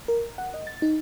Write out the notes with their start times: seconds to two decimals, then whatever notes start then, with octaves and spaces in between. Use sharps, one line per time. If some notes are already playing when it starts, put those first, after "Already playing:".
0.08 A#4
0.38 F#5
0.54 D#5
0.67 A6
0.82 D#4